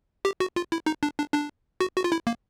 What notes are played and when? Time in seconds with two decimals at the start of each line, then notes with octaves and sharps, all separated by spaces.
0.25 G4
0.40 F#4
0.56 F4
0.72 E4
0.86 D#4
1.03 D4
1.18 D4
1.34 D4
1.81 F#4
1.96 F#4
2.04 F4
2.12 E4
2.27 A#3